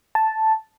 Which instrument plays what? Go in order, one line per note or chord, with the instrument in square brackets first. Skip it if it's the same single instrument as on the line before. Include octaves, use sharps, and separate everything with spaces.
[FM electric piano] A5